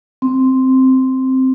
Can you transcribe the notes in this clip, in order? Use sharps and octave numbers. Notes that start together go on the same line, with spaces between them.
C4